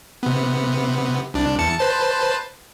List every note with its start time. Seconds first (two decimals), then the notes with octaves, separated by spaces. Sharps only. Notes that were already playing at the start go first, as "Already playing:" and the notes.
0.23 C3 B3
1.34 C2 D4
1.59 E2 A5 C#7
1.79 B4 C5 A5